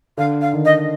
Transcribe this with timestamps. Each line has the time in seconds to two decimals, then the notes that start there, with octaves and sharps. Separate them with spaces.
0.18 D3 F5
0.41 F5
0.53 D#3
0.65 D#5